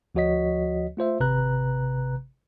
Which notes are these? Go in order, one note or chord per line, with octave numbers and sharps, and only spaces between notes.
D2 F3 F#4 C#5 D#5 B6
A3 F4 C5 E5
G#1 C3 B4 A#5 F#6